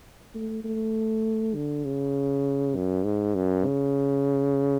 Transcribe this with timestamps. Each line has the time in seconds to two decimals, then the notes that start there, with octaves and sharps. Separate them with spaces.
0.35 A3
0.64 A3
1.55 D3
1.85 C#3
2.76 F#2
3.05 G#2
3.35 F#2
3.66 C#3